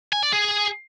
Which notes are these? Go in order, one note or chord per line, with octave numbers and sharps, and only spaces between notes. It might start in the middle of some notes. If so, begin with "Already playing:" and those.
G#5
D5
G#4